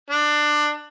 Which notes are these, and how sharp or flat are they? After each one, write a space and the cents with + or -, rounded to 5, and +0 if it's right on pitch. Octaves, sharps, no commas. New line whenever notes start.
D4 +20